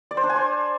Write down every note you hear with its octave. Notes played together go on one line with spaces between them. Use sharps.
D5
C5
D4
G#5
C5